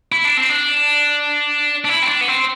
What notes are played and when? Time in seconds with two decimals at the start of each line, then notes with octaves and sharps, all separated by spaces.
0.12 E4
0.25 D4
0.37 C4
0.49 D4
1.85 D4
1.89 E4
2.03 C4
2.08 D4
2.21 B3
2.28 C4